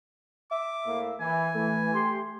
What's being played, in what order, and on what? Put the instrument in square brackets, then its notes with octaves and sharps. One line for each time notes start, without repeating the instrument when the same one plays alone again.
[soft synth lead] E5 [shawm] D6
[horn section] A2 A#3
[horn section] E3 [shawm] G#5
[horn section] E3 [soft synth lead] A3
[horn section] G4 C6